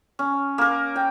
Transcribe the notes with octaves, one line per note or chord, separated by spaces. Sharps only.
C#4
A#3 A#4
G5